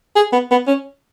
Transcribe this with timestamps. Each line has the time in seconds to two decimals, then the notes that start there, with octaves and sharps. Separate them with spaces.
0.16 G#4
0.32 B3
0.51 B3
0.67 C#4